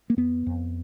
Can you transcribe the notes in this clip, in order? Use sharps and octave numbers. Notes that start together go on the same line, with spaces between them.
A#3
F2 B3
F2